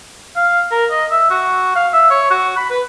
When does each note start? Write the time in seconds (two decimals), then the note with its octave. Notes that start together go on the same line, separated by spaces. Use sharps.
0.36 F5
0.71 A#4
0.90 D#5
1.10 E5
1.30 F#4
1.75 F5
1.93 E5
2.10 C#5
2.30 F#4
2.57 B5
2.70 B4